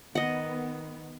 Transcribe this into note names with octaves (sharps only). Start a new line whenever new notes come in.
D#3 B3 D#5 F#5